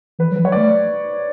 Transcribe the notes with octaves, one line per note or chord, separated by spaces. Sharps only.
E3 B4
F#3
E3 B4
F#3 C#5
D5
A3